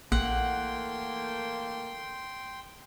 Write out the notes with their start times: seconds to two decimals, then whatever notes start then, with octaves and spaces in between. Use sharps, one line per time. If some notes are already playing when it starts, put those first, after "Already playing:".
0.12 A#1 E3 A3 A#3 F#5 G5 C6